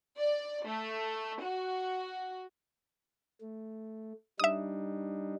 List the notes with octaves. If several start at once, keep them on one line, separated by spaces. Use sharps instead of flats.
D5
A3
F#4
A3
G3 D4 D#4 E5 D#6